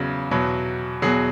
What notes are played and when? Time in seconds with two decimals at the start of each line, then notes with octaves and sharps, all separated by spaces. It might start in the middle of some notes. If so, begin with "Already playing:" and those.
Already playing: E2 C#3 F#3
0.31 E2 B2 F#3
1.02 E2 B2 F#3 G#4